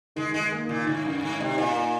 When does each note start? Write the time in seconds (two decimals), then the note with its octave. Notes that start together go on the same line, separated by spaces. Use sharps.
0.16 D#3 G#3
0.33 D#3 G#3
0.51 A#3
0.69 A#2 D#3
0.87 G#2 D#3
1.04 F#2 D#3
1.22 G#2 D#3
1.40 C3 D#4
1.58 A#2 D#4
1.75 A#3